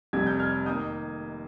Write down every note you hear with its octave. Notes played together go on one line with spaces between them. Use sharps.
F1 F2 C3 G3 G#6
G6
F6 G#6
D#3 A#3 D#6 G6